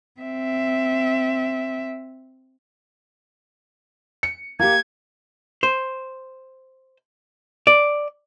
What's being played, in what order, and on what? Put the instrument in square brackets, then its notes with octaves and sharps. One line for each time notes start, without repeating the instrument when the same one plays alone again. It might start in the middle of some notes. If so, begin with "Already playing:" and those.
[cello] C4 E5
[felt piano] C#7
[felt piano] A#3 G4 [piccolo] G#6
[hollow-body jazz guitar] C5
D5